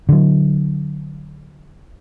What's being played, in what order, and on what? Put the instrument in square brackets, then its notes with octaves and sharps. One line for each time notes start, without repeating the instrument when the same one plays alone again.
[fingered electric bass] D3 F#3